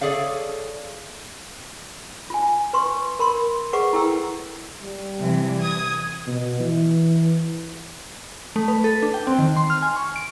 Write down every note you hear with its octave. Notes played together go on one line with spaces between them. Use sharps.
G#4 A4 C#5 D5 F5
F4 G#5
B4 C6 C#6
A#4 B5 C6
G#4 B4 F#5 C#6 D6
E4 A4 G5 E6
G3
C3 E3
D#6 G#6
B2
E3
A3
B4
A4
D4
G5
C4
D#3
C6
F6
G#5
C#6
D7